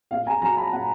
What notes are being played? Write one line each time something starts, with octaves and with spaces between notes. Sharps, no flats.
A#2 F5
G#5 A#5
F#3 G#5 A#5
A5 B5
A#2 F#5